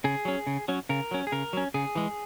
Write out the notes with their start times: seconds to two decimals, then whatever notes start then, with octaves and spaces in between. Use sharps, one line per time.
0.04 C#3 G#4
0.25 F#3 C#4
0.47 C#3
0.68 F#3 C#4
0.89 C#3 A#4
1.11 F#3 C#4
1.27 G#4
1.32 C#3 A#4
1.53 F#3 C#4
1.74 C#3 G#4
1.95 E3 G#3